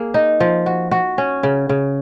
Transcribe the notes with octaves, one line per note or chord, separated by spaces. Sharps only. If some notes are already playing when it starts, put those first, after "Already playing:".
Already playing: A#3 G#4
D#4
F3
F#4
F#4
C#4
C#3
C#3